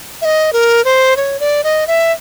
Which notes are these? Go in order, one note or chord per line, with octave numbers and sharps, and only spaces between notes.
E5
D#5
A#4
C5
C#5
D5
D#5
E5